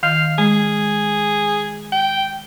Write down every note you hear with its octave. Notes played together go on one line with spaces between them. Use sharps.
D#3 F5
G#3 G#4
G5